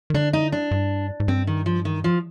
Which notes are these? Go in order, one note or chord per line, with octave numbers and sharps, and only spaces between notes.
D#3
D3 D4
D#4
D4
G2
G#2
G2 C4
D#3
F3
D#3
F3